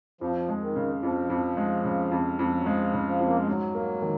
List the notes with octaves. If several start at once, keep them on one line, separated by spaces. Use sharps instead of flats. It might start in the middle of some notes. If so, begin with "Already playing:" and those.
F2 F3
G#3
D#3
C#3
F2 F3
F2
G#3
C#3
F2
F2
F#3
F3 G#3
C#3
F3
F2
A#3
G#3
G#2 F#3
A#3
D#3